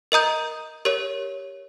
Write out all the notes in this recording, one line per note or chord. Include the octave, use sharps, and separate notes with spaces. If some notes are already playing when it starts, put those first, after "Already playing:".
A#4 D#5 A#5 D#6 G6
G4 A#4 C#5